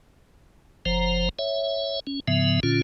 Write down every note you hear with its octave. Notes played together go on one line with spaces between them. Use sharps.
F#1 F3 C5 A#5
C#5 E5
C#4
G#2 C#3 F3 B3 E5
A#2 D3 C#4 F4